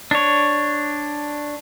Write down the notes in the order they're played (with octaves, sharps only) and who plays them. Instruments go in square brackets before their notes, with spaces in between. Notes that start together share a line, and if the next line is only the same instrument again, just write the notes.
[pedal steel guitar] D4 C#5